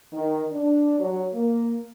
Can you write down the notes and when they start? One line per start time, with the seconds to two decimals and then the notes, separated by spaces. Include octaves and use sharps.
0.13 D#3
0.51 D4
1.00 F#3
1.33 A#3